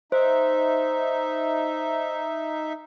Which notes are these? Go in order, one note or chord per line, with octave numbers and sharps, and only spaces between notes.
D#4 C5 E5